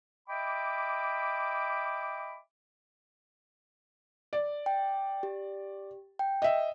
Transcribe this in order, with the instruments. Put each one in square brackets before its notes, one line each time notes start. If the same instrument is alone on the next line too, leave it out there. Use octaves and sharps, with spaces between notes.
[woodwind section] D#5 E5 G5 B5 D6
[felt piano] D5
[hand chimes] G5
G4
G5
[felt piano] D#5 E5